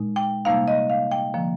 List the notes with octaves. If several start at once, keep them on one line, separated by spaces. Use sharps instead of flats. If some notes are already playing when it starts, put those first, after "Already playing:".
Already playing: A#2 G#3 D#4
G5
F2 C3 G3 A#3 D#4 F5
D#5
F5
G5
D3 F3 A#3